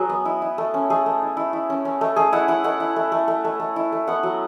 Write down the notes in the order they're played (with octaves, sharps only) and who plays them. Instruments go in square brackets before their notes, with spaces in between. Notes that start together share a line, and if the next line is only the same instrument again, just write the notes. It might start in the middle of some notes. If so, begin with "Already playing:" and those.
Already playing: [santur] F#3 G#4 B4
B3
E4
E4
A3
C#4
A3 G#4
A3
E4
E4
E4
C#4
C#4
A3
A3 G#4
E4 F#5
E4 F#5
A3 F#5
E4
A3
A3
A3
A3
A3
E4
A3
B3 F#5
F#3